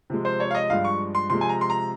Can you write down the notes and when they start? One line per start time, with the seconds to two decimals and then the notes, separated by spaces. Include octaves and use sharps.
0.10 C3 F3 G#3
0.25 C5
0.40 C#5
0.51 F5
0.55 D#5
0.70 G2 F3 G#3 F5
0.85 C#6
1.15 C6
1.30 C3 F3 G#3 C6
1.41 G#5
1.49 A#5
1.61 C6
1.70 A#5